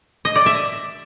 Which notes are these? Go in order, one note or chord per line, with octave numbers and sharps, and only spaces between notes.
D#5
D5
E5